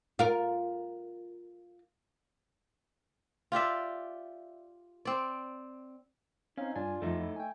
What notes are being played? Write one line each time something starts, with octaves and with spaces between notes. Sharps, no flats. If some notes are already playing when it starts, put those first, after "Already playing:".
F4 A#4
F4 G4 D5 E5
C4 D5
C4 C#4 D#4 F5
G2 D4 F4 G#5
F2 F3 A3 D#4
E4
A3 G5 G#5